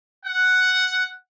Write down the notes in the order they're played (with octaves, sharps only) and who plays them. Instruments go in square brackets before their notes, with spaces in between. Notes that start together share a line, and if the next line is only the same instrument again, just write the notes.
[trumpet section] F#5